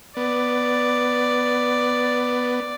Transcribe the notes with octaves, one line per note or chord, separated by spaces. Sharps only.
B3 D5